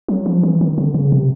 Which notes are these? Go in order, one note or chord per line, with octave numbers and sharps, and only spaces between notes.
F#3
F3
E3
D#3
D3
C#3
C3